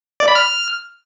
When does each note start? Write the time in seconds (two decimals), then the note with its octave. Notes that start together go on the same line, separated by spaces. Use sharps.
0.20 D5
0.28 B5
0.35 F6